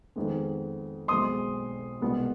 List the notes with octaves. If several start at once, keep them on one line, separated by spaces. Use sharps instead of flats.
F2 D#3 G#3 B3
B1 B2 G#3 C4 C6 D#6
C2 B2 G#3 B3